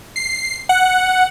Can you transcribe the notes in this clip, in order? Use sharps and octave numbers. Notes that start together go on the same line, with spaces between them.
C7
F#5